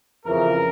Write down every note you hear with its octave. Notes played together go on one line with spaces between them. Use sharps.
F2 C#3 E3 A#4